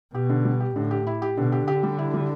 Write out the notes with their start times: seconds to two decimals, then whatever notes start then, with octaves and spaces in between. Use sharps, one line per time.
0.14 B2 G4
0.29 D3
0.45 G3
0.60 G4
0.76 A2 D3
0.91 G4
1.07 E4
1.22 G4
1.37 B2 D3
1.52 G4
1.67 D3 G4
1.83 G3
1.98 E4
2.14 G3